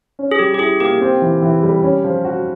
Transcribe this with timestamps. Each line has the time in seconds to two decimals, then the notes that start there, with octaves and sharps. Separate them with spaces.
0.19 C#4
0.31 G#4
0.39 G3 G4
0.54 G4
0.59 E4 G#4
0.80 A#3 G4
1.01 C4
1.22 E3
1.42 E3
1.63 G3
1.83 C#4
2.04 F3
2.25 F#4